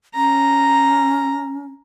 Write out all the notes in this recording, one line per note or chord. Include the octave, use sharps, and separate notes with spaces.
C#4 A#5